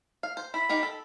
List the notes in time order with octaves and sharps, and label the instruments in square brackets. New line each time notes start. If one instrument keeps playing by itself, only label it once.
[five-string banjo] F5
C5
[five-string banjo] E4 [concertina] B5
[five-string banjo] D#4 G4 A#4
A4